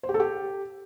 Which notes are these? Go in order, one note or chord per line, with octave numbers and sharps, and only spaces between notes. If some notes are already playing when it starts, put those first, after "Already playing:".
C5
G4
A4
G4